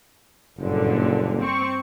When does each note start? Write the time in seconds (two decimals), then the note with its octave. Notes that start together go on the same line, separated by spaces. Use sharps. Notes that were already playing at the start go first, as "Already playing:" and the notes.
0.58 F#1 G2 A#2 D3
1.42 C4 C#6